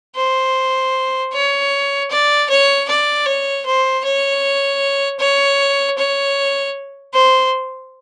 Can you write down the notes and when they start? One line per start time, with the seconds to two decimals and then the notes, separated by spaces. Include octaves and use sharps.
0.16 C5
1.33 C#5
2.11 D5
2.50 C#5
2.88 D5
3.26 C#5
3.66 C5
4.04 C#5
5.19 C#5
5.98 C#5
7.14 C5